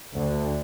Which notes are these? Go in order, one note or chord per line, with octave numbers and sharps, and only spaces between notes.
D2